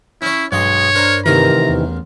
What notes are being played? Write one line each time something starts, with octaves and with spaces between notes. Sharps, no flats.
C#4 E4 C#5
B1 G2 G#3 C#5 D#5
D4 A#4 C5
A1 C3 D#3 E3 A#4 A#5
E2